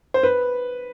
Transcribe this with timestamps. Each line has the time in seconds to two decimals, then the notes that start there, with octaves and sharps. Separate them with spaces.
0.14 C5
0.23 B4